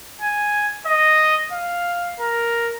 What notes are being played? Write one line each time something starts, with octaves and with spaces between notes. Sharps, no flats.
G#5
D#5
F5
A#4